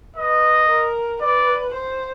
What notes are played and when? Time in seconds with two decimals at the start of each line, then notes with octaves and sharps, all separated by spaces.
0.16 B4 D#5
0.69 A#4
1.21 B4 D5
1.74 C5